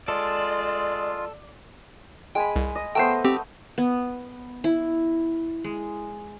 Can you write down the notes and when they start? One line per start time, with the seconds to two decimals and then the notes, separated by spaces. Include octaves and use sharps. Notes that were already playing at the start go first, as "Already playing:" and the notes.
0.08 G#3 F4 A4 D5
2.35 G#3 G5 G#5 B5
2.56 C2
2.75 D#5
2.95 A3 B3 C5 G5 A5 C7
3.25 C4 G4
3.78 B3
4.64 E4
5.64 G#3